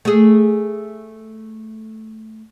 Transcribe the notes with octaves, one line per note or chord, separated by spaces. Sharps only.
A3 G#4